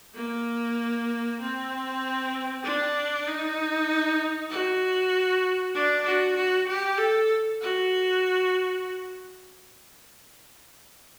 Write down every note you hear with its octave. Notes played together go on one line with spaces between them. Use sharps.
A#3
C4
D4
D#4
F#4
D4
F#4
F#4
G4
A4
F#4